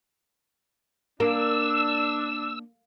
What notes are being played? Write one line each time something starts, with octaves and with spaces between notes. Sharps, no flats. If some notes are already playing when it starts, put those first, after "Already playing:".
A#3 D4 E6